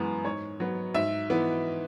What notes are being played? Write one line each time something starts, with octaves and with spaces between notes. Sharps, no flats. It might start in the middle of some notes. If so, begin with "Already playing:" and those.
Already playing: F#2 E3 G#3 B3
G#2 C#5
F#3 B3
G#2 E5
E3 B3